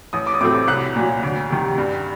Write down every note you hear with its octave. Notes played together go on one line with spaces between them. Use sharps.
A1 D#6
D6
D#6
A2 F#3 A3 C4 D6
D6
C2 F#6
A#2 F#3
D2
C3 D#3
G2